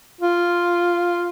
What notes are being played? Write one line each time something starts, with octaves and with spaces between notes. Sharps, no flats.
F4